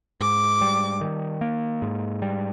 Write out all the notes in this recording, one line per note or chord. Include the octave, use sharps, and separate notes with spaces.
G#2 D6
G3
D#3
A#3
G#2
G3